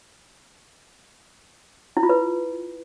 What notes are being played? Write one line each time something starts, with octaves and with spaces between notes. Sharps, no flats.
E4
F4
B4